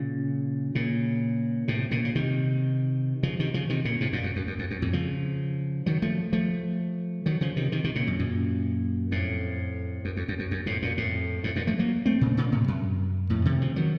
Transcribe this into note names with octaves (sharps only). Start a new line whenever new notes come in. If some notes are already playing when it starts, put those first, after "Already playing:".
Already playing: A#2 C#3
A#2 C#3
A2 C3
A#2 C#3
C#3
C3 D#3
C#3 F3
C3 D#3
C#3 F3
C3 D#3
A#2 C#3
A2 C3
F#2 A#2
F#2
F#2
F#2
F2
F#2
F2 A2
C#3 F3
D#3 F#3
F3 A3
F3 A3
D#3 F#3
C#3 F3
C3 D#3
C3 D#3
C3 D#3
A#2 C#3
F#2
F#2 A#2
F2 A2
F#2
F2
F#2
F#2
F#2
F2 A2
F#2 A#2
F2 A2
F2 A2
F#2 A#2
F3 A3
F#3 A#3
A3 C4
A#2 C#3
A#2 C#3
A2 C3
F#2
F2 A2
C3 D#3
C#3 F3
D#3 F#3